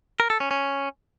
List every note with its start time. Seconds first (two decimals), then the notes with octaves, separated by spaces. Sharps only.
0.20 A#4
0.30 A4
0.40 C#4
0.51 C#4